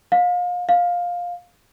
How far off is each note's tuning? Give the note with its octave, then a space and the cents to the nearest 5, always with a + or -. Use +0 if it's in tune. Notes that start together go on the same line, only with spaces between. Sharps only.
F5 +35
F5 +15